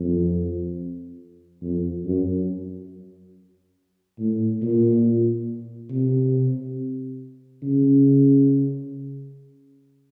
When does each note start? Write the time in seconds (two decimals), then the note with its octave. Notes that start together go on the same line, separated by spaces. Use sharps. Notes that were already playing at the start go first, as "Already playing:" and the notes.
Already playing: F2
1.62 F2
2.05 F#2
4.19 A2
4.62 A#2
5.91 C3
7.63 C#3